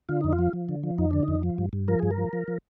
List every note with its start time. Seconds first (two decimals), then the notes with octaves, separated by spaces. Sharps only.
0.09 D3 F4
0.21 F2 D#4
0.33 F4
0.39 F3
0.53 F3
0.69 D3
0.83 F3
0.98 F2 D#4
1.11 D3 D4
1.23 D#4
1.28 F2
1.43 F3
1.58 G2
1.73 G2
1.88 F3 A#4
1.99 G2 G#4
2.11 A#4
2.18 F3
2.33 F3
2.48 F3